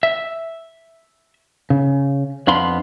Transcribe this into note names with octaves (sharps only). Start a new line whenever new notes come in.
E5
C#3
F2 B3 D4 F5 B5 C6